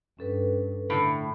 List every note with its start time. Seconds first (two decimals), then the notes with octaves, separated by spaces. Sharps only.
0.19 G2 C#4 A4 B4
0.90 A2 D3